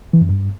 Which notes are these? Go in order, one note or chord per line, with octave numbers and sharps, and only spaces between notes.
E3
F#2
G2